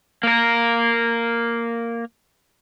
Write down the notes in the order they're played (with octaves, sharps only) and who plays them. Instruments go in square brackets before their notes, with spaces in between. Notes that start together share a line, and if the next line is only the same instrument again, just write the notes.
[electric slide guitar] A#3 A#4